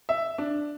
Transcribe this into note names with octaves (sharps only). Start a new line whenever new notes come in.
E5
D4